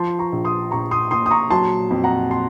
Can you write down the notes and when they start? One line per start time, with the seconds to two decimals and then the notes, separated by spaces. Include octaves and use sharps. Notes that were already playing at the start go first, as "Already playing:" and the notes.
Already playing: F3 A5 C6
0.19 A#5 C#6
0.32 A#1
0.45 C6 D#6
0.71 A#1 A#5 C#6
0.91 C6 D#6
1.11 A#2 C6 D#6
1.26 D#6
1.31 A#5 C#6
1.51 F#3 A5 C6
1.91 F2
2.04 F#5 A#5
2.30 A5 C6